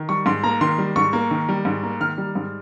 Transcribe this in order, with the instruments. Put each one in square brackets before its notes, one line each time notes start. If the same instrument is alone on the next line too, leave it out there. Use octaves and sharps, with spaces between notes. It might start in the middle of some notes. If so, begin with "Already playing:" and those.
Already playing: [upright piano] D#3
G3 C#6
G#2 C6
A#3 A#5
D#3 C6
G3
G#2 C#6
A#3
D#3
G3
G#2
A#3
D#3 F6
G3
G#2